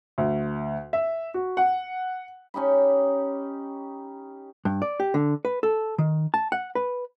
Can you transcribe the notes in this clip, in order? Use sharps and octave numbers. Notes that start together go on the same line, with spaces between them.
D2
E5
F#4
F#5
C#4 D#4 G4 B5
G2
D5
G4
D3
B4
A4
D#3
A5
F#5
B4